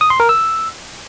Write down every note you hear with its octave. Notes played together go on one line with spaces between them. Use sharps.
D#6
C6
A#4
E6